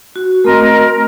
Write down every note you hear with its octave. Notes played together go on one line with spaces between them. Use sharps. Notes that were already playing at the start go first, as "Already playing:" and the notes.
F#4
A3 C4 A#4 D#5